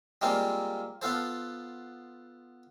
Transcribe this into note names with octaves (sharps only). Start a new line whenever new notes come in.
G3 G#3 A#3 C4 F4
B3 F4 A4 C5